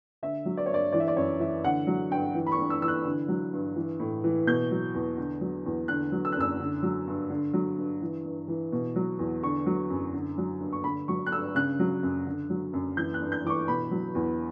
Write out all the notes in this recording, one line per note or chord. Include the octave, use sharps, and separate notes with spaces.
D3 E5
F#3
D5
C#5
G2 D5
E3 D5
E5
D5
F#2 C#5
E3 E5
D3 F#5
F#3
G2 G5
E3
B5
C#6
G2
E6
E3 E6
F#6
D3
F#3
G2
E3
A2
E3
B2 G6
F#3
E2
D3
F#3
E2
D3 F#6
F#3
E6
F#6
F#2 E6
D3
F#3
G2
D3
F#3
G2
E3
G2
E3
B2
F#3
E2
D3 C#6
F#3
F#2
D3
F#3
G2
C#6
D3 B5
F#3 C#6
F#6
G2 E6
C#3 F#6
F#3
F#2
D3
F#3
F#2
E3 G6
F#6
G2
G6
E3 D6
C#6
B2 B5
F#3
E2